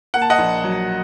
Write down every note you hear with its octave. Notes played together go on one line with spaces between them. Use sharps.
A#3 F#5
A5
D#5 F#5
A#1
F#3